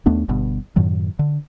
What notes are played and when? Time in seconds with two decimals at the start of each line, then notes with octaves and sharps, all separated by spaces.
0.06 D#2 A3 B3 D4
0.29 G1 G2 B2
0.76 F#2 A2 D#3 F#3
1.19 D3